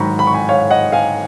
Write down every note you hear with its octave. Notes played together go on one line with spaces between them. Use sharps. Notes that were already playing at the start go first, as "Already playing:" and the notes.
Already playing: G#2 D#3 F#3 A#5 B5 C#6
B5
C#6
G#5 B5
C#5 F5
D#5 F#5
F5 G#5